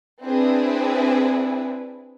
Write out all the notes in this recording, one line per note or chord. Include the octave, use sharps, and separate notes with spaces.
C4 D4 E4 G#4 B4